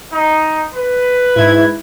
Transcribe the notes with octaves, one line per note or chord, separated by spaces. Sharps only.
D#4
B4
G#2 E4 G#6